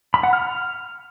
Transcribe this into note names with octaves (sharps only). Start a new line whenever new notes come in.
B5
F#5
F6